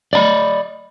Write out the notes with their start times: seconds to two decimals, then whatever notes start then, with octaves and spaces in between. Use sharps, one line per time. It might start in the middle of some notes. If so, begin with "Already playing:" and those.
0.13 D5 D#5 A#5 B5